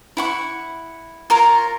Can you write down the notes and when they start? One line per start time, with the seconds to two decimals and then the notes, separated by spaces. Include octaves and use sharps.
0.17 E4 F#5 C#6
1.30 F4 A#4 C#5 A#5